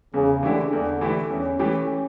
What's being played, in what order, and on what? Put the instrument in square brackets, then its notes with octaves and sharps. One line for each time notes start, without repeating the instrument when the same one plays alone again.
[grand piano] E2 [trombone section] C#3
[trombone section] D3 [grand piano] E3 A3 E4 G4
[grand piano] E2 [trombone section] D3
[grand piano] E3 A3 E4 G4
[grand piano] E2 [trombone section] C#4
[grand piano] E3 A3 E4 G4